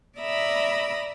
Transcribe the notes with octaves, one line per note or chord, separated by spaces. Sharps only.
D5 E5 A#5 B5 D#6 E6